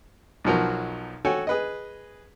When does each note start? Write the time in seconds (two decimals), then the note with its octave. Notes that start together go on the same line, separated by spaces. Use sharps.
0.44 B1 B2 F3 F#3 A#4
1.25 F#4 A4 C#5 G5 G#5
1.47 G#4 B4 D#5